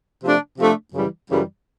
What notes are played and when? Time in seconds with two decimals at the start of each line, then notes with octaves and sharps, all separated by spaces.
0.24 C3 F3 A3 D4
0.59 C3 F3 A3 D4
0.94 F#2 C#3 E3 G3
1.29 F#2 C#3 E3 G3